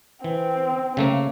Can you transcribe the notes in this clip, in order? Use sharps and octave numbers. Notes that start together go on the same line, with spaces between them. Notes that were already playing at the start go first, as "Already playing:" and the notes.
E3 C4
C#3 A3 A#3